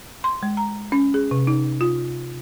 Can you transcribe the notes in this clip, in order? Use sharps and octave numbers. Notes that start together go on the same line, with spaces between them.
C6
G#3
A#5
C#4
G#4
C3
D#4
F4